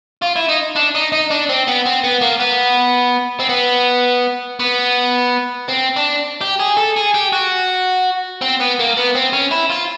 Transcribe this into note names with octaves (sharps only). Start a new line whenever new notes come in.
F4
E4
D#4
D4
D#4
D#4
D4
C4
B3
C4
B3
A#3
B3
C4
B3
B3
C4
D4
G4
G#4
A4
G#4
G4
F#4
C4
B3
A#3
B3
C4
C#4
E4
F4